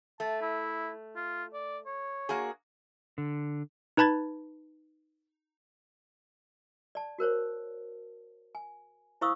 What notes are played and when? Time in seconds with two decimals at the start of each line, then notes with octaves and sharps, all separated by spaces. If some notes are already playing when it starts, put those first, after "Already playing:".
0.20 A3 A5
0.42 E4
1.16 F4
1.54 D5
1.86 C#5
2.29 A#3 F#4 G#4
3.18 D3
3.97 D#4 B4 A5 B5 G#6 A6
6.95 D5 A5
7.18 F#4 A#4 C5 C#5
8.55 G#5
9.21 E4 C5 F5 C#6 D#6 E6